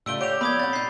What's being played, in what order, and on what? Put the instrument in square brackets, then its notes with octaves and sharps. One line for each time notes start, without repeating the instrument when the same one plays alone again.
[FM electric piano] A2 C#3 [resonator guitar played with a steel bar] G3 A3 F4 [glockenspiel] E6 D7 G7
[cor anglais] G4 [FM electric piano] C#5 F#5 D6 [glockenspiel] D7 F7
[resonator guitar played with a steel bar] E3 F3 D5 [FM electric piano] A#3 B3 [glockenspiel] B5 D#6 G#6
[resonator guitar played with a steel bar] A#2 F#5 [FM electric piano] C4 C#5 [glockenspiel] A6
[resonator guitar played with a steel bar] A#2 D#4 [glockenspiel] G6 C7